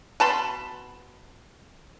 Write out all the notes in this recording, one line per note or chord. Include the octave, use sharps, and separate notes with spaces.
B2 A5 B5 C6